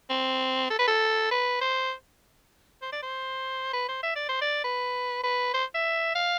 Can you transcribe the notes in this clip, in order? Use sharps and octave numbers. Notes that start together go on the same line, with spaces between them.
C4
A4
B4
A4
B4
C5
C5
D5
C5
B4
C5
E5
D5
C5
D5
B4
B4
C5
E5
F5